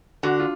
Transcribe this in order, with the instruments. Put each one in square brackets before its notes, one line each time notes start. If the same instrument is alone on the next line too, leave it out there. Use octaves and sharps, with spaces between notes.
[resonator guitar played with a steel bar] D3 [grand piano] F#4
[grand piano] F4